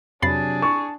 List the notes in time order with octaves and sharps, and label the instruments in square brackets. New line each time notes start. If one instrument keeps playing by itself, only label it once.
[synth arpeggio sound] F2 B5 C7 [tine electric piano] C3 F#3 A6 [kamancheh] D4 G#4
[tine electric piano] A5 [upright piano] C#6